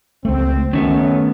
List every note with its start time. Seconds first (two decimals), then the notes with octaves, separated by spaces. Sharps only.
0.25 C#2 A3 C4
0.73 F#2 D#3 A3 B3 C#4